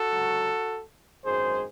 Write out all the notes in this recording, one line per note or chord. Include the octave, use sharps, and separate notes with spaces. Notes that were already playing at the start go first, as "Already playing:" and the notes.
Already playing: F#4 A4
C#2 C3 F#3
G#1 F#2 D#3 G#3 G#4 C5